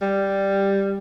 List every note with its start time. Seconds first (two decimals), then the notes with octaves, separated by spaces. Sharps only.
0.01 G3